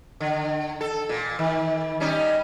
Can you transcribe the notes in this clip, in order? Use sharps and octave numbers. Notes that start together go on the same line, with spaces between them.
D3
A4
A#2
D#3
G3 C#4 D#4